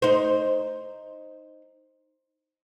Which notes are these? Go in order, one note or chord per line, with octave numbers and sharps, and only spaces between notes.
D#4 C5